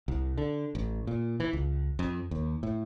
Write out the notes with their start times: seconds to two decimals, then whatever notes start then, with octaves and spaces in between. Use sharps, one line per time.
0.08 C2
0.38 D3
0.75 A1
1.07 A#2
1.40 E3
1.53 C#2
1.99 F2
2.31 D#2
2.63 A2